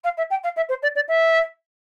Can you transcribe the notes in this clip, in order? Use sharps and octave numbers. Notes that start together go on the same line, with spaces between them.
F5
E5
G5
F5
E5
C5
D5
D5
E5